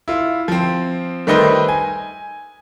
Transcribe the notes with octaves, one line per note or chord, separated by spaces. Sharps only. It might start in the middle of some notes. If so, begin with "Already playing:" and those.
E4 F4
F3 C4
D#3 G3 A3 D#4 B4 C5
G#5